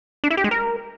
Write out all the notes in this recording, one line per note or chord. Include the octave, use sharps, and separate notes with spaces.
D4
E4
G4
G#3
A#4